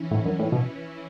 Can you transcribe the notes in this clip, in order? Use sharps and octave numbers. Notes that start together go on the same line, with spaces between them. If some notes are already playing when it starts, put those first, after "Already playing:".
Already playing: E3 C#4 E4
A2
F#2
A2
B2